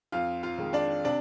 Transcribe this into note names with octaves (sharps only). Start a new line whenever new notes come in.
F2 F4 F5
F4 F5
D#3 G#3
D4 D5
C3 D4 D5